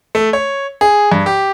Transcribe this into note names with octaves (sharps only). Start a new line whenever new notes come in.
A3
C#5
G#4
G2
G4